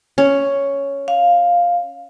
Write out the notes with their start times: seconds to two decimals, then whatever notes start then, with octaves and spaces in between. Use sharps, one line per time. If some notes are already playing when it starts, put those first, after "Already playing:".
0.18 C#4
1.08 F5